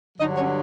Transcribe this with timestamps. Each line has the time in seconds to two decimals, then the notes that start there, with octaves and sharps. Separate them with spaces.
0.18 G2 D3 F#3 D#4 D#5
0.36 C#4 C#5